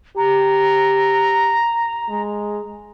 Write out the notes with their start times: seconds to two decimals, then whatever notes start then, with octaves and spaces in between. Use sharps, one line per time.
0.17 G4 A#5
2.09 G#3